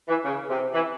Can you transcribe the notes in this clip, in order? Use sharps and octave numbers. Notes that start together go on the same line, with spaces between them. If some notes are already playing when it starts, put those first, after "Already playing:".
E3
C#3
C3
E3